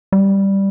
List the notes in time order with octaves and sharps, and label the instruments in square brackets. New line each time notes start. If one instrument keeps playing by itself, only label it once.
[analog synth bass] G3